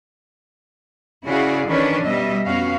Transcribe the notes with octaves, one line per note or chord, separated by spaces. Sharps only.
C#3 E4 F#4 G#4 D5 F5
D#3 E3 C#4 D4 B4 C#5
B2 G3 D#5 E5
F2 B3 C#4 F#4 F5